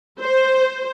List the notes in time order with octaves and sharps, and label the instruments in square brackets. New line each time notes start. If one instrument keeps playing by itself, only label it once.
[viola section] C5